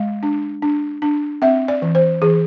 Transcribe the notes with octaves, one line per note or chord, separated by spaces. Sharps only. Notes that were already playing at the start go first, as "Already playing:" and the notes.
Already playing: G#3 F5
D4
D4
D4
C4 E5
D5
E3
C5
E3 G#4